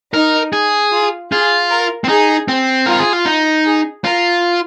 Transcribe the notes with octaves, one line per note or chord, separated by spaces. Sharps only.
D#4 A#4
G#4
F4
F4 G#4
A#4
C4
D#4 G#4
C4
F4 A#4
G#4
F4
D#4
G#4
F4 A#4